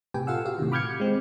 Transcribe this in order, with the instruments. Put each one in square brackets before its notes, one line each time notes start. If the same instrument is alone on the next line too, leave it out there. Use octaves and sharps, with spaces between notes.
[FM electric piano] A2 C3 G4 B4 G5 G#5
F4 A4 F5 F#5 E6
F#4 G4 F5
A2 C3 D#3
B5 D6 F6 G6 G#6 C#7
G#3 C4